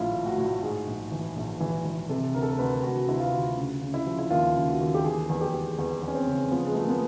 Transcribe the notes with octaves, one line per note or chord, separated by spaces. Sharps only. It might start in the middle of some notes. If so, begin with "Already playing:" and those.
Already playing: A#1 A2 F3 E4 F4
A2
F#4
A2
G#2 G#4
A#1
E3
A#1
E3
E3
C3 A4
D2 A#4
A4
A#4
D2 B4
D2 F#4
D2 E4
F4
D2
C#3
C#3
E4
F3
E4
D#2 F4
C#3
F#4
D#2
G4
E3 G#4
E2
G4
E2
E2
E2
C#4
C4
C#3
F3 B3
G#3
F3 A3
A#3
B3